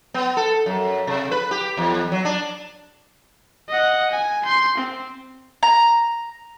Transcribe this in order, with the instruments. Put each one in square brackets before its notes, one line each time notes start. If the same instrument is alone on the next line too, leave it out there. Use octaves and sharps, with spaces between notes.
[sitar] B3
A4
F#2
C3
B4
G4
E2
F#3
D4
[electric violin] D#5 F#5
G#5
C6 G6
C4
[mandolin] A#5